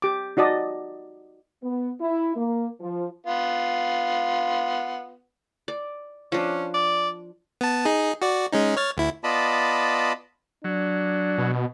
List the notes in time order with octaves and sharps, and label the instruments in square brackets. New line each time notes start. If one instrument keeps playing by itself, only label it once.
[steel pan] G4 D6
D#4 F#4 D5 D#5 A5
[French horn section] B3
E4
A#3
F3
[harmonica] B3 F4
[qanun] D5
[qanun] F3 D4 [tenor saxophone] C#4
[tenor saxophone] D5
[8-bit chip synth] B3 A5
D#4 G#4
F#4 D5
G#3 C#4 D#4
C#5 F6 A6
D2 E4
[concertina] B3 F4 D5 D#5 A5 B5
[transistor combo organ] F#3 [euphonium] D4
[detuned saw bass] B2